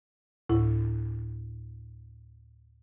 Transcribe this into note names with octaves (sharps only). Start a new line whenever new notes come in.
D2 A2 E4